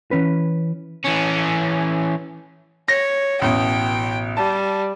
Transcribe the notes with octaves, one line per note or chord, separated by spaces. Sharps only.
E3 C#4 B4
E3 C#4
C#5 A#6
A1 B2 G5
G3 A5